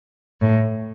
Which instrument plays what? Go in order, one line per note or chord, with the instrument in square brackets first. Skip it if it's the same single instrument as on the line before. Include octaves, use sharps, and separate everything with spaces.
[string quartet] A2